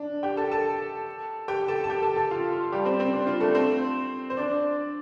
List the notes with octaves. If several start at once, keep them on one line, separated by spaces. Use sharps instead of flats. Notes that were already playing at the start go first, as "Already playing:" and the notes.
Already playing: D4
G4 G5
A4 A5
A4 A5
G4 G5
A4 A5
A5
G4 G5
A4 A5
A4 A5
F4 F5
F4
G3 G4
C4 C5
C4 C5
D4
F4
A3 A4
C4 C5
C5
D4 D5